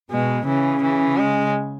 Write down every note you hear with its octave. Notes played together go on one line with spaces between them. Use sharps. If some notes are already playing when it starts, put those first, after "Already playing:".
B2 G#3
C#3 E3
E3
G#3